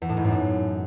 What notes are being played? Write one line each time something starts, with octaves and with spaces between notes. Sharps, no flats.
E2
A2
G#2
F#2
A2